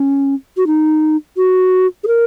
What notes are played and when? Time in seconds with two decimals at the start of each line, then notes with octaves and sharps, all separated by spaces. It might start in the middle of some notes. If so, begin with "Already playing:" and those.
Already playing: C#4
0.57 F#4
0.67 D#4
1.37 F#4
2.04 G#4
2.07 A#4